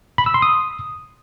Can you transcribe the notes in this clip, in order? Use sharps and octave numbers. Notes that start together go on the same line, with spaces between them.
B5
E6
C6
D#6